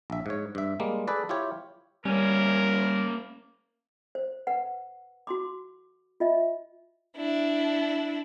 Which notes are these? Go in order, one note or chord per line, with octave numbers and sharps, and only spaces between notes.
A#1 E5
G#2 C#5
G2 E5
G3 G#3 A#3
G#4 A4 B4 D5
E4 F4 G4 C#5
G3 A#3 C#4 A#4
C5
B4 F#5
F#4 C6 D6
F4 D#5 E5
D4 E4